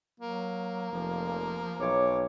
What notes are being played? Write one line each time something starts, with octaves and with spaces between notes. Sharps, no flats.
F#3 A#3
F1 F3
B1 C#5 D6